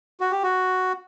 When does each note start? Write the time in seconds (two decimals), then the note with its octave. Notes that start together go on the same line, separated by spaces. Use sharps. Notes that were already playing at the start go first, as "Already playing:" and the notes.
0.20 F#4
0.31 G4
0.43 F#4